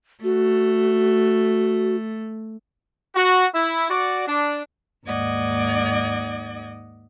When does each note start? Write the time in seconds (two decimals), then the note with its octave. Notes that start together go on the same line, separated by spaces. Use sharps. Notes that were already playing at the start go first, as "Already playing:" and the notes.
0.24 A3 F#4
3.15 F#4
3.53 E4
3.89 F#4 D5
4.27 D4
5.05 D#2 G#2 D5 D#5 F#5 G#6